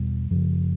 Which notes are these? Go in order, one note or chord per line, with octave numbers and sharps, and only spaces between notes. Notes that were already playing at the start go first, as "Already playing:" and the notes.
Already playing: E2 B2 G3
F#2 C#3 F3